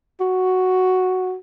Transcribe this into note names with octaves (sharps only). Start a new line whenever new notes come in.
F#4